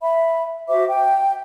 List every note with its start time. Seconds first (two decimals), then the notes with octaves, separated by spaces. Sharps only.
0.02 E5 B5
0.68 F#4 C5 E5 D6
0.89 G5